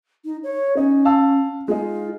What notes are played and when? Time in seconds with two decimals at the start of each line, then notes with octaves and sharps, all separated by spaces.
0.25 D#4
0.44 C#5
0.77 C#4 D#4
1.05 F5 A5 E6
1.68 G#3 D#4 F4